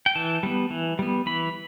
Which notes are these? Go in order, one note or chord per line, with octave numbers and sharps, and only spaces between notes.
G5
E3 A5
G3 B3
E3
G3 B3
E3 B5